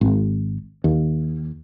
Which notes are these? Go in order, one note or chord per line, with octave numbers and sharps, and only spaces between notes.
G#1
D#2